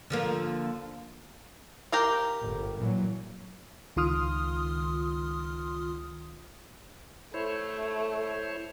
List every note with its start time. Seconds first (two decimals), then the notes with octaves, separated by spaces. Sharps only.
0.10 D3 F3 A#3
1.92 G4 A#4 F5
2.40 G1
2.78 A#2 E3 F#3
3.96 C#2 D#3 F4 C6 D#6 F6
7.34 A3 E4 C5 C#5